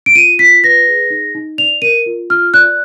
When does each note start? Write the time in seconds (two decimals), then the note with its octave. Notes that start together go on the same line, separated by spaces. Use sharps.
0.06 D7
0.15 F4 D#7
0.39 F4 B6
0.64 B4 A#6
0.88 G#4
1.10 D#4
1.35 D#4
1.58 D5 F7
1.82 A#4 D#7
2.06 F4
2.30 F4 F6
2.54 D5 F#6